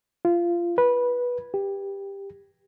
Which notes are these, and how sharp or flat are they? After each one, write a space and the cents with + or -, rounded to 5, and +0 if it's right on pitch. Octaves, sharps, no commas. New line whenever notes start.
F4 -20
B4 -15
G4 +15